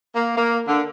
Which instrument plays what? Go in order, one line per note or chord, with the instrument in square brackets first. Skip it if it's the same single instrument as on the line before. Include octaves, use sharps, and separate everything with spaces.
[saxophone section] A#3
A#3
D3